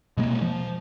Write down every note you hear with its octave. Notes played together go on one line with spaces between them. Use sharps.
B2 G#3 A#3
F3